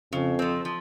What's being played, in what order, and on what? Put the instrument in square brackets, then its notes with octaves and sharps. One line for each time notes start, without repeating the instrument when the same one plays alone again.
[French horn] F2 [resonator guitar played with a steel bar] C#3
[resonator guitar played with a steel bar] F3 C4
F3